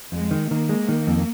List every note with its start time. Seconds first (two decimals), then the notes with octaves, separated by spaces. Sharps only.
0.12 F2 G#3
0.31 D#3
0.50 D#3 A#3
0.69 G#3
0.89 D#3
1.07 F2